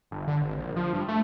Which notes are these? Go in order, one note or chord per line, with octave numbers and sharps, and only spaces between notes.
G1
D3
G#1
A#1
F3
G2
A3